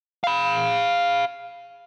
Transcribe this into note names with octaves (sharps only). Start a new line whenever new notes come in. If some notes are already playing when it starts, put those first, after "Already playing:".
F5 B5